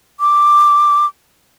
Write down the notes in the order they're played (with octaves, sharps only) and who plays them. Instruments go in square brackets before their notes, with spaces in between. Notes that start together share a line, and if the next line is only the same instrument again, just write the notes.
[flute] D6